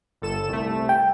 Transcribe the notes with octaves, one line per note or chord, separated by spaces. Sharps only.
G1 A4 E7
C2 A3
G5